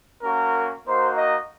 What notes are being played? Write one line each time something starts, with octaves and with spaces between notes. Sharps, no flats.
A#3 C#4 F#4 A#4
A#3 D#4 F#4 C5
D#5